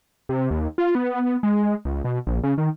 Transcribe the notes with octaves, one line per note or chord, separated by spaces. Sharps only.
C3
D#2
F4
B3
G#3
C#2
B2
A#1
C#3
D#3